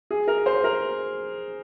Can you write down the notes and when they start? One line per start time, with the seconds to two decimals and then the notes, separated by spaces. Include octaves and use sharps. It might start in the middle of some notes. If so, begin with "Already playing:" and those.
0.11 G#4
0.28 A#4
0.46 C5
0.64 A#4